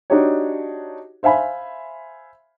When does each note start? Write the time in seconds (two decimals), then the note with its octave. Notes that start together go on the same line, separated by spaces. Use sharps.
0.10 D4 D#4 F#4 G4 C#5
1.23 C5 E5 F5 G#5 B5